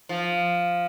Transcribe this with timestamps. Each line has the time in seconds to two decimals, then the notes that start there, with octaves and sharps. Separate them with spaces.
0.09 F3